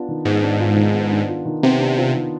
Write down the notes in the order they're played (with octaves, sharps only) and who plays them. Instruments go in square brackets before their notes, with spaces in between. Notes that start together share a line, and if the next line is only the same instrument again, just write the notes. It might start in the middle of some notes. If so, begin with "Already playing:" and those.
Already playing: [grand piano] B3 D4 F4
D#3
[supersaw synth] G#2 [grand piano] B3
[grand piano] D4
F4
D#3
B3
D4
F4
D#3
[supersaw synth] C3 [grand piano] B3
[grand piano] D4
F4
D#3